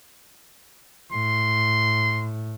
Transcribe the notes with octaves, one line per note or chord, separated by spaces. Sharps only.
A2 C6